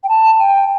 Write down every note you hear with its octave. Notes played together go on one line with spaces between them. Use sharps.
G5
A5
G5